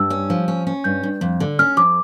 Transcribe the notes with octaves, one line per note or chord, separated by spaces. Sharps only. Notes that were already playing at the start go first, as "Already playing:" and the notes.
Already playing: G2 E6
C#4
F3
C#4
C#4
G2 G6
G2
F2
D3
C#4 F6
F2 D6